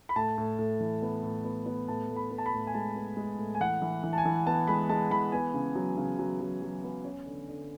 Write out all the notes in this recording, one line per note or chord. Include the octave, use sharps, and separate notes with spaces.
B5
A2 A5
A2
A2
E3
B3
A2
B3
B3
A2 A5
A2
B5
B3
A5
B5
A2
G#5
G#3 A5
B3
G#3
A2
G#5
E3 F#5
E3
E3
A5
G#5
E3
B3 A5
G#3 B5
G#3 A5
E3 B5
B3 G#5
C#3
F#3
C#3
F#3
F#3
F#3
B3
C#4
D3
D3